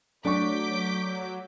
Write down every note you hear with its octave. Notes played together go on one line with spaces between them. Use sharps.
F#3 A3 D4 C#6 D6 G6 B6